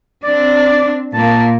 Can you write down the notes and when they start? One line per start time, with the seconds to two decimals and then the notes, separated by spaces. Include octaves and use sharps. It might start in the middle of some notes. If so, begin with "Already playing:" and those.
0.24 C4 D4 D5
1.14 A#2 A#3 A5